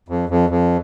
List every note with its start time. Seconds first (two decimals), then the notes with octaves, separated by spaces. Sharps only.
0.08 F2
0.29 F2
0.50 F2